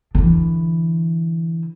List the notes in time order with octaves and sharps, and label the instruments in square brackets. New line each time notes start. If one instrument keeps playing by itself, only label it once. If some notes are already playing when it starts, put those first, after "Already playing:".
[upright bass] D3 E3